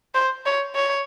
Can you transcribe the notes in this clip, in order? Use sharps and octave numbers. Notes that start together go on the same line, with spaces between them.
C5
C#5
C#5